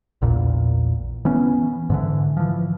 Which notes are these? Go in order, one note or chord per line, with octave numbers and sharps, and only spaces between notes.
A#1 E2 A#2
E3 B3 C#4
G#2 D3 E3
E3 F3